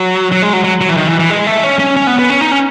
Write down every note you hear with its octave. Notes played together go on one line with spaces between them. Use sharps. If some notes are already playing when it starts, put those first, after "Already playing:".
Already playing: F#3
F#3
G#3
F#3
F#3
F#3
E3
D#3
E3
E3
G#3
A3
C#4
C#4
C#4
B3
B3
C#4
D#4
C#4